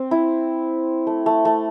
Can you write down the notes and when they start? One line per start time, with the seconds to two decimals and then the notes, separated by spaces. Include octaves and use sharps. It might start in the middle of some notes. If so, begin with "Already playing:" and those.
Already playing: C4
0.11 E4
1.07 A3
1.26 A3
1.45 A3